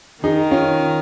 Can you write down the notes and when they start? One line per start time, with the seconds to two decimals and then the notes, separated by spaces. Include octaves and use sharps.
0.24 D#3 D#4 G#4
0.51 C#4 F4